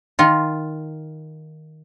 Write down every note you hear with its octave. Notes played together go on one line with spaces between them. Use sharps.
D#3 F4